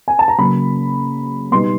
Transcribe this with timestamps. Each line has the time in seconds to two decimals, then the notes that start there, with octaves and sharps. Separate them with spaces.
0.08 G#5
0.19 A5
0.28 A#5
0.38 C#3 F#3 A#3 B5
1.51 B2 G3 B3 D#4 C6